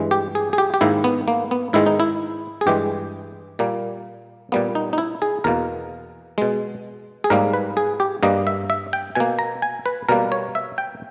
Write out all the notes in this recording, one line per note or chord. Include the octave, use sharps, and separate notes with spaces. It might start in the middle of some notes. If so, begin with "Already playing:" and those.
Already playing: G2 E3 G#3
G4
G#4
G#4
G4
G4
G#2 D#3 A#3 E4
B3
A#3
B3
G#2 D#3 G#3 E4
D#4
E4
G#4
G2 E3 G#3 G4
A#2 G3 A#3
A#2 G3 A#3 B3
D#4
D#4
E4
G#4
E2 B2 A#3 A#4
B2 G#3
G#4
G#2 G3 A#3 A#4
B4
G#4
G4
G2 G3 A#3 D#5
E5
E5
G5
B2 A#3 G#5
A#5
G#5
B4
B2 G3 A#3 A#4
C#5
E5
G5